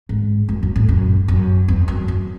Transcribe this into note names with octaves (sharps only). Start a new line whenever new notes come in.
G#2
F#2
F#2
A2
F#2
F#2
E2
F#2
F#2